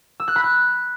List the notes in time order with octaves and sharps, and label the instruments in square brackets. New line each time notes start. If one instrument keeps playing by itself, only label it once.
[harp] E6
F#6
B5
F#6